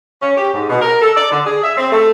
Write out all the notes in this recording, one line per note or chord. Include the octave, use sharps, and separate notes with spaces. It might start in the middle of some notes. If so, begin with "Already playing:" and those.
C#4
G4
G#2
B2
A#4
A4
D5
D3
G#4
E5
C4
A3